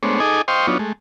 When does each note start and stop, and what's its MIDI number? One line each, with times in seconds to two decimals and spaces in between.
0.03 0.20 56
0.03 0.20 57
0.03 0.20 59
0.03 0.20 62
0.03 0.20 72
0.03 0.20 73
0.20 0.42 63
0.20 0.42 68
0.20 0.42 69
0.20 0.42 75
0.20 0.42 80
0.20 0.42 86
0.48 0.67 72
0.48 0.67 75
0.48 0.67 77
0.48 0.67 79
0.48 0.67 84
0.48 0.67 85
0.67 0.78 54
0.67 0.78 59
0.67 0.78 62
0.67 0.78 63
0.67 0.78 65
0.67 0.78 73
0.79 0.93 56
0.79 0.93 57